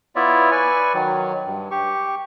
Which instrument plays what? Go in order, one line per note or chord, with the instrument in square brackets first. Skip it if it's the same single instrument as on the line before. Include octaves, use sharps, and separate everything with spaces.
[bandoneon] B3 E4 F4 C#5 D5 E5
B4 D5 G#5 C#6
D#3 F#3
G2
G4 C#6